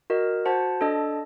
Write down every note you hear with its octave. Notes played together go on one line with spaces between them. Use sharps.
F#4 A#4 D#5
F#4 C5 F#5 A5
D4 A4 D#5 A5